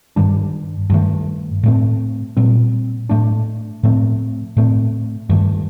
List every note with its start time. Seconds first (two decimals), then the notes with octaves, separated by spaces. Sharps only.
0.16 G2 D#3 G3 D4
0.90 G2 D#3 A3
1.63 A2 A3 C4
2.37 A#2 G3 C4
3.09 A2 A3 D4
3.83 A2 F3 A3 C4
4.57 A2 A3 C4
5.30 G2 D#3 A3